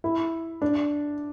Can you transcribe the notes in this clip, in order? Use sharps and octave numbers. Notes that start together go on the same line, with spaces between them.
E4
D4